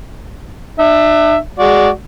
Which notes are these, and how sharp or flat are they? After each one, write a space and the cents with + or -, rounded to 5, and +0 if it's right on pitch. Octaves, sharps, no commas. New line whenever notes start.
D4 +40 E5 +5
G#3 +0 F#4 +0 D5 -10